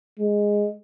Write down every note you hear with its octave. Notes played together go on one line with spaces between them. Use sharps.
G#3